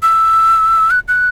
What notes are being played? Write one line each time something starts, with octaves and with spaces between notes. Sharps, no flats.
E6
F#6
F#6